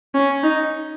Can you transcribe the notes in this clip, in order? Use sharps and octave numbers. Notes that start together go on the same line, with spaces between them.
C#4
D#4